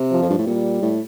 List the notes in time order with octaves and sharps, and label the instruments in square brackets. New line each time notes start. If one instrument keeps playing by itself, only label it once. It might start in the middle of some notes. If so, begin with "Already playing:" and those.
Already playing: [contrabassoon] C3
[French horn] F3
[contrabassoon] F2
G2
A2
[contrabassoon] A#2 [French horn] G3
[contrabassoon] A2